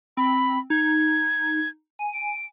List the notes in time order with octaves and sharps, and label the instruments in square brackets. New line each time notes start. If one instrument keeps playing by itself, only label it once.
[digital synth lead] C4 [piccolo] B5
[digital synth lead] D#4 [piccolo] G#6
[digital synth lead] G#5
[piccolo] D7